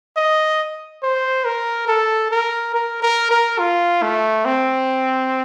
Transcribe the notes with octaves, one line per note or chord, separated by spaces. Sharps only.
D#5
C5
A#4
A4
A#4
A#4
A#4
A#4
F4
A3
C4